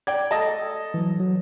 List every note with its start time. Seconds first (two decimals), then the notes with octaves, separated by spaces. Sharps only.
0.07 D5 G5 G#6
0.31 A4 D#5 A5
0.94 E3 F#3
1.20 F#3